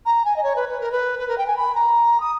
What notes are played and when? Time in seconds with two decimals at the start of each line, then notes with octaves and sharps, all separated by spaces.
0.06 A#5
0.25 G#5
0.36 D#5
0.43 C#5
0.56 B4
0.69 B4
0.80 A#4
0.92 B4
1.19 B4
1.28 A#4
1.38 G5
1.47 G#5
1.57 B5
1.75 A#5
2.20 D#6